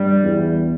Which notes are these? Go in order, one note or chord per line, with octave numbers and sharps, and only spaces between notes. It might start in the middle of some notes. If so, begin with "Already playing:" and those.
Already playing: G2 G3
E2